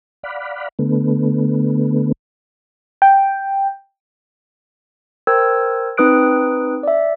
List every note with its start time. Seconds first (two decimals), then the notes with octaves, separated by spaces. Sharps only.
0.23 D5 F5 F#5 B5
0.79 D3 A3 B3
3.02 G5
5.27 A#4 C5 G5 E6 G#6
5.97 C4 D#4 B4 D#6 F#6 D7
6.83 D5 E5